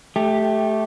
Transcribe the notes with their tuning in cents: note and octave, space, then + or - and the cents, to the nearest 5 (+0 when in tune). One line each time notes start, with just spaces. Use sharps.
A3 -15 G4 +0